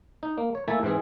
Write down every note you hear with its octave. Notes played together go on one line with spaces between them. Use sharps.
D#4
A#3
C#5
A3 A#3 E4 E5 G#5 A5
G#2 E3 C4 G#4